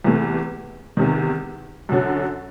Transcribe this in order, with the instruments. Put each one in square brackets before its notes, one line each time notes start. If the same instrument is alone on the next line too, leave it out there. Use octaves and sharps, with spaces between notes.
[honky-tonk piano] E2 C3 E3 A3
E2 C3 D#3
F#2 D3 F#3